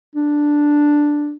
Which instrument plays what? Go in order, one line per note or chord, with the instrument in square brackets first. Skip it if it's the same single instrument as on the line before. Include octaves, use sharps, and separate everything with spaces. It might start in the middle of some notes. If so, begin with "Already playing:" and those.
[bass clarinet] D4